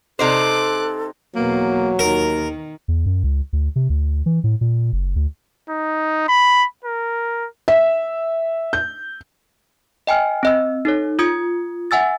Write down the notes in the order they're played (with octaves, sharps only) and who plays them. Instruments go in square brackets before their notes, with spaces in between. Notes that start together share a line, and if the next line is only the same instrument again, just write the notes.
[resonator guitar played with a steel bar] C3 D#4 C5 [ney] A4 [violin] D6 F#6
[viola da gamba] E2 B2 B3 [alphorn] F#3 [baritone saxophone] A#3
[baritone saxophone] D#2 [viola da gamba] D#3 [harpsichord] A#4
[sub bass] E2
F#2
C#2
D2
C3
D2
E3
A2
A#2
F#1
D2
[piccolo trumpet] D#4
B5
A#4
[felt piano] E5
G6
[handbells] D#5 G5 G#5 F6
C4 D#5 E6
D#4 A4 C#5
F4 D#6 G#6 C#7
E5 F#5 G#5 E6 A6